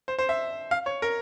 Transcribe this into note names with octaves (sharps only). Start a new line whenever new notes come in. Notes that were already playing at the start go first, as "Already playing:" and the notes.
C5
C5
E5
F5
C#5
A#4